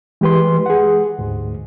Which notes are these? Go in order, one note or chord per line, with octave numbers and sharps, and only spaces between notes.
E3 G#3 G4 B4 C6
G#4 F#5
D2 G#2